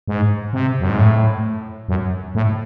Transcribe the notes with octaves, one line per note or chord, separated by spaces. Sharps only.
G#2
C3
F#2
G#2
A2
F#2
A2